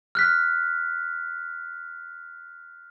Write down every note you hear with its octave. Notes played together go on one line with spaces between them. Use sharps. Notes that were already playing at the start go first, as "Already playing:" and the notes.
F6 F#6 B6